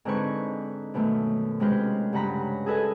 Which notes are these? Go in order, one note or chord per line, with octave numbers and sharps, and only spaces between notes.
G#2 D3 C4 D#4 B4 C#6
F#2 B2 D#3 A3
C3 G#3 C#4 F4 B4 C5
G2 C#3 F#5 A#5 B5
G#4 A4 B4 D#5 G#5